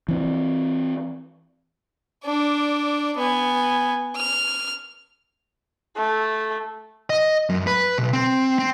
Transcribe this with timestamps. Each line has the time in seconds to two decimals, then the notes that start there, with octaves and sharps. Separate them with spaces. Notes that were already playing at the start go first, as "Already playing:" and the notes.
0.09 E3 C4
2.25 D4 D5
3.17 B3 G#5
4.16 F6
5.97 A3
7.10 D#5
7.49 F#2
7.67 B4
7.98 B1
8.13 C4
8.59 C4